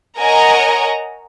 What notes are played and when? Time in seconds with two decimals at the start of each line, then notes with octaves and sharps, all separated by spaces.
0.19 A#4 C#5 D#5 F#5 G#5 A#5